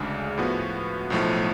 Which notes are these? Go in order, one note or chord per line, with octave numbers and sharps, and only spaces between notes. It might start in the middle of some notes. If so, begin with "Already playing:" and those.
Already playing: D2 C#3 G#3 D4
A2 F3 B3 F#4
B1 A2 F3 A3